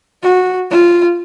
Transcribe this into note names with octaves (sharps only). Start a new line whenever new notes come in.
F#4
F4